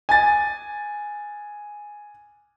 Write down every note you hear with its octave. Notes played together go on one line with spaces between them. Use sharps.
G#5 A6